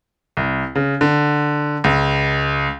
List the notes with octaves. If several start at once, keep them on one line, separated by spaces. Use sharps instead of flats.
C2
C#3
D3
C#2